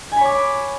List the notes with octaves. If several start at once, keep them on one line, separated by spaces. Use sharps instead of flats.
C#5 G#5 B5 D6